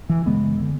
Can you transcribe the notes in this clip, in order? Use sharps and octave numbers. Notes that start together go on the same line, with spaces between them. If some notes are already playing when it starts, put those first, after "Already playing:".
E3
F#2 C#3 G#3 B3
D3